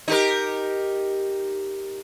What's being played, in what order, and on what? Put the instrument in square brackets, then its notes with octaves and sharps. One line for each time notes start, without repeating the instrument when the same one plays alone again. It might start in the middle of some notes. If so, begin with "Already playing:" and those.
[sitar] D#4 G4 A#4